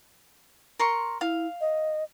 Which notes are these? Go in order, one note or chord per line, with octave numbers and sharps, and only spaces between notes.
A#4 C6 C#6
E4 F5
D#5